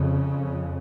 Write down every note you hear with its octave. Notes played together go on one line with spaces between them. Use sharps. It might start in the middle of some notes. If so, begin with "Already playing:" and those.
Already playing: F2 C#3